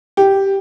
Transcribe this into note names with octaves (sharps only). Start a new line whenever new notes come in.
G4